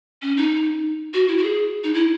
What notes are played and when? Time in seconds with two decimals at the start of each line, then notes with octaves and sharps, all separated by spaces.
0.22 C#4
0.37 D#4
1.14 F#4
1.28 E4
1.37 F#4
1.43 G#4
1.84 D#4
1.94 E4